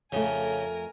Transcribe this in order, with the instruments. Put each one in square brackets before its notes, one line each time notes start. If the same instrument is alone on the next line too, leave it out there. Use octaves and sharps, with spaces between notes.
[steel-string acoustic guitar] F2 A3 [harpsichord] C#3 [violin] A#4 G#5